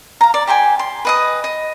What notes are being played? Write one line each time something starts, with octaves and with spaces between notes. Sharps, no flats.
F5 A#5
D5
G4 C5 G5 G#5
C6
B4 D#5 D#6
D#5